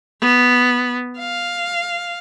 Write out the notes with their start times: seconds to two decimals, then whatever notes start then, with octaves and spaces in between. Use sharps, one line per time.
0.21 B3
1.19 F5